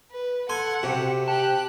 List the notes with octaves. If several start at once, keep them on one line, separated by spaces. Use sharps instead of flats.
B4
A4 F#5 G#5 C6
C3 F#4 G4
G4 G5 A5 F#6